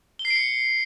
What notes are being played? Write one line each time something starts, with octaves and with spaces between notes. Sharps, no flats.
G7
C7
D7
C#7